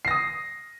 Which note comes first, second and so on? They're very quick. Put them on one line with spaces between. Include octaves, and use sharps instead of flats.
C7 A#6 D#6